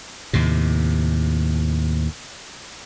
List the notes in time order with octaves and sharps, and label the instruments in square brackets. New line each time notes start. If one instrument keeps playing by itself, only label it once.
[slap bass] D#2 A2 C3